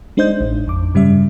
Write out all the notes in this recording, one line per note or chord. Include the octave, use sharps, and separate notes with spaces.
G#3 D4 D#4 C5 D#5 G6
A1
F2 D6
G2 C#3 G3 C#4 E5